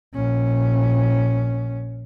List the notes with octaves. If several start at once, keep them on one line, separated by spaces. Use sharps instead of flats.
A#1 C#4